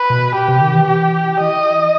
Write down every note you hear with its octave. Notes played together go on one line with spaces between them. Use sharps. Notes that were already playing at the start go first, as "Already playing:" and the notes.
Already playing: B4
B2
G4
C3
D#3
E3
G4
E3 D#5